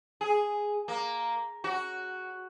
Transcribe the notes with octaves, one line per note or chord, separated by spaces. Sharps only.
G#4
A#3
F#4